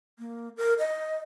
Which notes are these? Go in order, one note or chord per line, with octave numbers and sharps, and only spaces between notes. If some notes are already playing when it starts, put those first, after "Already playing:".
A#3
A#4
D#5